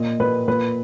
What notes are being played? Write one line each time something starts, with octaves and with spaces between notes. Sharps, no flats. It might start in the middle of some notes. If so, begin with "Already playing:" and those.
Already playing: A#2 D#5
A#2 B4
A#2 B4